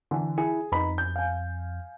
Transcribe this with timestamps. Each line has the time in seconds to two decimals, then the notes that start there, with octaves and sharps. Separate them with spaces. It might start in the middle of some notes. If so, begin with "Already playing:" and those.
0.11 D3 E3
0.38 E4 G#4
0.72 F2 D#4 B4 B5
0.98 G6
1.16 F5 G#5